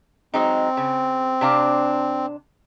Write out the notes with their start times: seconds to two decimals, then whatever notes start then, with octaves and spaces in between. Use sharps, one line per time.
0.34 F#3 G#3 C4 D#4
0.77 C#3
1.41 C3 D4 F5